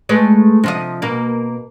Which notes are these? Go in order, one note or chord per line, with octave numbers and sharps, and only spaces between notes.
G#3 A3 B4
C3 F3 D#5
B2 A#3